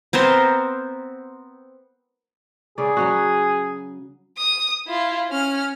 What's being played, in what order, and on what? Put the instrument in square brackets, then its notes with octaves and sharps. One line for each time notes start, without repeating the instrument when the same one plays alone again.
[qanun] B3 C4 A#4 C5
[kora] C#3 D5 [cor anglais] G#4
[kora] F#3 C#4 F#4
[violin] D#6
E4 F4
C#4 F6